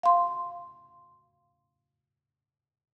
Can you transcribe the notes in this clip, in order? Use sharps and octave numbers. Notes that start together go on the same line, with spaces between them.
F5 C6